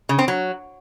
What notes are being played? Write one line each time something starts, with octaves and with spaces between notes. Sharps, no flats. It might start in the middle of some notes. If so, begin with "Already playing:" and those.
C#3
C4
F#3